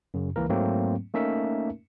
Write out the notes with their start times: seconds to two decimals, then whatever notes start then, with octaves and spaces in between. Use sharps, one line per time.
0.14 F#2 C#3
0.36 C#2 E3 A#3 A#4
0.49 G#2 F#3 A3 A#3 C4
1.14 A3 A#3 C#4 D#4 A#4 E5